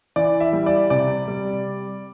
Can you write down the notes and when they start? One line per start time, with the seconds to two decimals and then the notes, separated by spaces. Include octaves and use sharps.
0.16 E3 D5
0.40 E5
0.53 G3
0.66 D5
0.90 C3 D5
1.28 G3